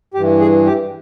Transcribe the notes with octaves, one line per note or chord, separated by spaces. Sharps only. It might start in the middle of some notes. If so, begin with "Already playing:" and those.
G2 E3 G4
G#4
G4